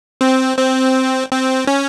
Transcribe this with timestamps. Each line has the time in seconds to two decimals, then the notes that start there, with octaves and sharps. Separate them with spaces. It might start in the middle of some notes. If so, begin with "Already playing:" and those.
0.21 C4
0.58 C4
1.31 C4
1.67 C#4